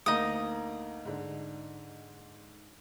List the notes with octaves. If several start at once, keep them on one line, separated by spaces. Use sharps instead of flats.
D2 A#3 D#4 A#5 D#6
G#2 D3